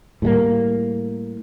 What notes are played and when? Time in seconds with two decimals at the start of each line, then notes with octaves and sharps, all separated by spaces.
0.22 A2 G3 G#3 A#3